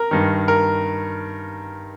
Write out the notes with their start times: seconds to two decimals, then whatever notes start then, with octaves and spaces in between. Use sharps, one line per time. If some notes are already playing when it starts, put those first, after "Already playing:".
Already playing: A#4
0.11 G2 D#3
0.48 A#4